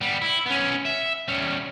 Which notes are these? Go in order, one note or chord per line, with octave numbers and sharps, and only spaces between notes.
G3 B3
E4
B3 C#4
E5
G3 C#4